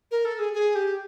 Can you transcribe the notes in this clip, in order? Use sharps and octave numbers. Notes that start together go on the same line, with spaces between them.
A#4
A4
G#4
G#4
G4